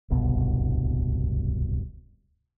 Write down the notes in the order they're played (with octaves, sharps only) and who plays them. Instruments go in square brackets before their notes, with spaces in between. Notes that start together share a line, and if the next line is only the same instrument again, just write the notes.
[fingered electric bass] D1 G1 C2 B2